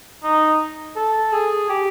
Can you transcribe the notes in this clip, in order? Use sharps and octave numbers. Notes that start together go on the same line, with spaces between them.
D#4
A4
G#4
G4